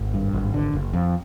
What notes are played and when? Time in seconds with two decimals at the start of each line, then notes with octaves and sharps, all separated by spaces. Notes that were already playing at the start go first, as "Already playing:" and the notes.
Already playing: G#1
0.14 G2
0.33 G#1
0.54 D3
0.73 F#1
0.93 F2